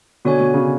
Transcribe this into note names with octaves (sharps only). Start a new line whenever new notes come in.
B2 D3 F#4 C#5 G#5
B2
C#3